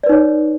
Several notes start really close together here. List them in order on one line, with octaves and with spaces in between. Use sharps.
D5 B4 D#4 C#5